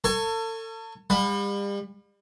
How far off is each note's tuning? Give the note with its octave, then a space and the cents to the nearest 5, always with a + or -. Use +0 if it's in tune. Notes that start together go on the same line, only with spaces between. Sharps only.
A4 +40 G#5 +0 C#6 +0
G3 +40 F#5 -45 B5 +5